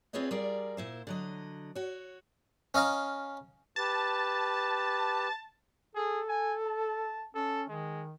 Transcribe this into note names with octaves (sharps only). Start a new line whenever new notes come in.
C4 F4 G#4 B4 C#5 D#5
G3 F4 G#4 A#4 D5
A#2 E4 C5
D3 F#3 D#5
F#4 C#5
C#4 D#5 F5 A#5
G4 B4 A5
G#4 A4
G#5
A5
C#4 A4
D#3 G#3